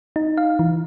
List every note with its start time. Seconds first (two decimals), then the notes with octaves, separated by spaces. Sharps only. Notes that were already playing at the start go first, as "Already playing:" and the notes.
0.16 D#4
0.37 F5
0.59 E3